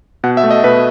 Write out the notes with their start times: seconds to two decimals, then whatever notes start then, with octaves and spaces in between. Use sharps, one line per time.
0.24 B2 F#5
0.37 E5
0.44 A3
0.51 D#5
0.64 B2 B4